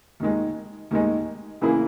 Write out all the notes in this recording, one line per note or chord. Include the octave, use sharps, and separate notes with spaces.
D#2 D#3 G#3
D#2 D#3 G#3
C#3 E3 A#3 E4 G#4